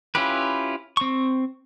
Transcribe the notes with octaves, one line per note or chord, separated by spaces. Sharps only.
C#4 E4 F4 G4 B4
C4 C#6